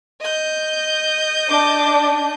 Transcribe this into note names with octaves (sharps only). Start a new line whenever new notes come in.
D#5 G6
D4 D6